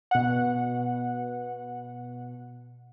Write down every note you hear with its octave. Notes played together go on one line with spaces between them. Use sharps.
B2 F#5